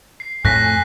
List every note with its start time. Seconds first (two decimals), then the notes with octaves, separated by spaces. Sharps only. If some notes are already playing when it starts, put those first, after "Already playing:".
0.20 C7
0.45 F2 A2 A3 G#5 F#6 A#6 B6